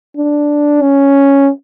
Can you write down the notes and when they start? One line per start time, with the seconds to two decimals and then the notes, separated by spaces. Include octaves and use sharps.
0.17 D4
0.82 C#4